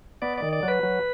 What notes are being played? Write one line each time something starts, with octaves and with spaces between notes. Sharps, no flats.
B3 D5
D#3 D5
D5
F#3 B4
F#3